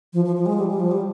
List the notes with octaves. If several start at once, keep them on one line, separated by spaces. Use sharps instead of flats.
F3
F3
F3
G#3
G3
G3
F3
G3